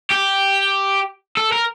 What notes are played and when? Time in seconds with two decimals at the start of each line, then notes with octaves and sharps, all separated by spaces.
0.11 G4
1.37 A4
1.52 A#4